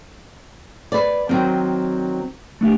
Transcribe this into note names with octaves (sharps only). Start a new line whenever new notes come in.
B4 D5
D#3 F#3 C4 C5
A3 D4 G4